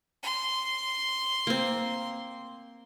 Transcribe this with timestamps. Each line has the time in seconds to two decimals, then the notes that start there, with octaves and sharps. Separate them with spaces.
0.23 C6
1.47 A#3 C4